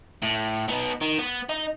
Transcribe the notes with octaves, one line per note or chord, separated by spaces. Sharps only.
A2
B3 D#4
D#3
B3
D#4